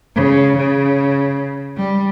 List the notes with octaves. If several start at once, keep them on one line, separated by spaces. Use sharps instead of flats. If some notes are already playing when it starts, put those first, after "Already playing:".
C#3
C#3
G3